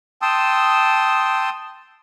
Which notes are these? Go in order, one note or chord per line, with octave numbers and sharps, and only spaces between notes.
G5 A5 C6 D#6 E6